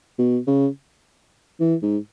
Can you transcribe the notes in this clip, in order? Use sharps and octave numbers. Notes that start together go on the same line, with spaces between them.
B2
C#3
E3
G#2